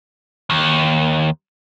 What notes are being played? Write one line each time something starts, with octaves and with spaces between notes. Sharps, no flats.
D#2